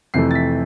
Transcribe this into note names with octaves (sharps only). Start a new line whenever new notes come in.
F2 C3 E3 A3 C7
A6
B6